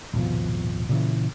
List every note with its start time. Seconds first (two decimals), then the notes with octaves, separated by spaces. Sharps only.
0.13 D#1 G#1 B2 F3
0.89 A#2 C#3 E3